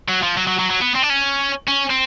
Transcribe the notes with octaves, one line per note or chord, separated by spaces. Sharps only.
F#3
F3
F#3
F#3
F#3
F#3
B3
C4
D4
C#4
C#4
C4